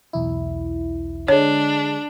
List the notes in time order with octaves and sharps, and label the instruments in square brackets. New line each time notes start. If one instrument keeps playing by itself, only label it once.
[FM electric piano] B1 E2 E4
[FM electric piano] D3 G#3 [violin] D4 [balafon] C#5